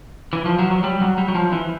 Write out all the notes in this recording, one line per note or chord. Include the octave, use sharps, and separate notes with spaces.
E3
F3
F#3
F#3
G3
F#3
G3
F#3
F3
E3